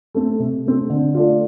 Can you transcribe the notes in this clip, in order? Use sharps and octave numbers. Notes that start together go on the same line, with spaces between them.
A3 C4
C3
A3 C4
D3
A3 D4 F4